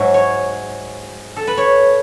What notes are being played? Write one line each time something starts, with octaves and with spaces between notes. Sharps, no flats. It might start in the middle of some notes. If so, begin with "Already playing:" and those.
Already playing: G#2 F#3 E5
C#5
A4
B4
C#5